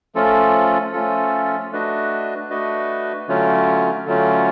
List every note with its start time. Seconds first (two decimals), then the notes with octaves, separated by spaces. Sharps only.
0.15 F3 A3 C#4 F4 A4
0.93 F3 A3 C#4 F4 A4
1.72 A3 D4 F#4 B4 D#5
2.50 A3 D4 F#4 B4 D#5
3.28 D3 F#3 A3 C#4 F4
4.06 D3 F#3 A3 C#4 F4